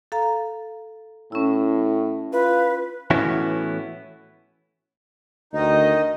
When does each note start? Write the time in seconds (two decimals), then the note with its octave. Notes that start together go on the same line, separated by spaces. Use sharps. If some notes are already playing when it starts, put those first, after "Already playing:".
0.12 A4 F5 A#5
1.32 A2 C#4 E4
2.33 F4 B4
3.10 A2 E3 B3 C#4 E4 F#4
5.53 D2 D#3 D#4 D#5